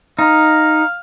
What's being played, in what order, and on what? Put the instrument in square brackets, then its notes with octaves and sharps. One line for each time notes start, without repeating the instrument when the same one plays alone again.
[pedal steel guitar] D#4 [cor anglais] F5